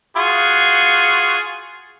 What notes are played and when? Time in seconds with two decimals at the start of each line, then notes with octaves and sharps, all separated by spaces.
0.16 F4 F#4 G#4